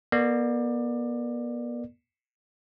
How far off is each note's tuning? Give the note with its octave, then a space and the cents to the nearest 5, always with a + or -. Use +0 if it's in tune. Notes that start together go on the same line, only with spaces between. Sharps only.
B3 -40 A4 +45 D5 +20